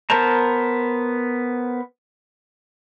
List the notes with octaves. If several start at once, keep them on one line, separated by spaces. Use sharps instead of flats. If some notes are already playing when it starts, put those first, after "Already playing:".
B3 A#4 C5 A5 A#5